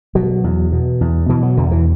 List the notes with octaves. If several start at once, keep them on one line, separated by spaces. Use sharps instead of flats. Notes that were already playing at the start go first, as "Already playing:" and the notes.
B2 F#3
E2
B2
E2
B2 E3
F#3
E2 D3
E3